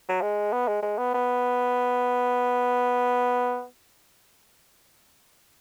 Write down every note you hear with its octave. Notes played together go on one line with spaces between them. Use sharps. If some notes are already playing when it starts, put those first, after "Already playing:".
F#3
G#3
B3
G#3
G#3
B3
B3